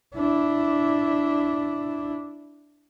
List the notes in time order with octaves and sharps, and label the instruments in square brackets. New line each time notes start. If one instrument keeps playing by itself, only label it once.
[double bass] D4 E4